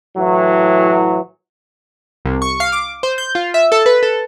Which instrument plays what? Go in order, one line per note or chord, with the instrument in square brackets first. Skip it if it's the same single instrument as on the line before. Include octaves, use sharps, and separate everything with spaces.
[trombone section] A2 E3 F#3
[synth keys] C2
C#6
F5
D6
C5
G6
F4
E5
A4
B4
A4